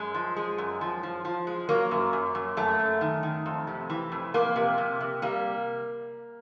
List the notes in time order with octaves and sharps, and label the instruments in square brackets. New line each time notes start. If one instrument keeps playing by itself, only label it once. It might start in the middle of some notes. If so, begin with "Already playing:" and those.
Already playing: [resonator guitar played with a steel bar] F#2 G#3
F3
G#3
F#2
F3
F3
F3
G#3
F#3 A#3
F#2
F#2
F#2
F#2 A3
F#2
D#3
D#3
F2
C3
E3
F2
F2 A#3
C3
C3
C3
G3 A#3